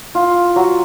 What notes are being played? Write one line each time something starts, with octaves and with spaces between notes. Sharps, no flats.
F4
F#3